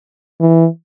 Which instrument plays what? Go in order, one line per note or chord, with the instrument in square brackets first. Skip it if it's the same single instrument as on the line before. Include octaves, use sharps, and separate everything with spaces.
[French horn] E3